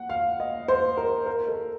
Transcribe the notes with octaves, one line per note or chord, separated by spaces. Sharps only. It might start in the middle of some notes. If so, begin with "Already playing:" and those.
Already playing: F#5
F5
D#5
C5
A#4
A#4
A4